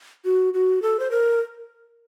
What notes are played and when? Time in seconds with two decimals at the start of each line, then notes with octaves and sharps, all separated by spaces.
0.25 F#4
0.54 F#4
0.82 A4
1.00 C5
1.11 A#4